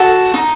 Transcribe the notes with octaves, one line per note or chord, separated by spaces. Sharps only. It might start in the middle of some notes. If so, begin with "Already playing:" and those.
Already playing: F#4 A4
D#4